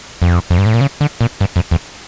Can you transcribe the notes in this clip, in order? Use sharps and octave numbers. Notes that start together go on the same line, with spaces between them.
F2
F2
G2
A2
A#2
C#3
D3
A#2
G2
F2
E2